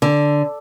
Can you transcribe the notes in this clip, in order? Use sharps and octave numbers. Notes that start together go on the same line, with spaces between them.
D3